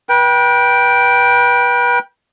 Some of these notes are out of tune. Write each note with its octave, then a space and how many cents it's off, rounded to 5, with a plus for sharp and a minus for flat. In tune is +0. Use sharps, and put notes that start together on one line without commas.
B4 -35 G5 +0